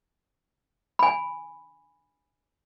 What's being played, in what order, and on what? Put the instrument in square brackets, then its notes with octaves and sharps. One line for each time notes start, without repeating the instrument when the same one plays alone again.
[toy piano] G#5 B5